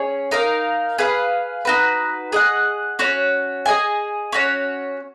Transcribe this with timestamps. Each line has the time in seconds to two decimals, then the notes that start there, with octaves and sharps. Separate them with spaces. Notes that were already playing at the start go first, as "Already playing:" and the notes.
Already playing: C#4 G#4 C#5
0.31 D#4 A#4 F5
0.98 G#4 B4 F5
1.65 D#4 F#4 B4
2.32 G#4 D#5 F#5
2.99 C#4 F#4 C#5
3.66 G#4 D#5 G#5
4.32 C#4 F#4 C#5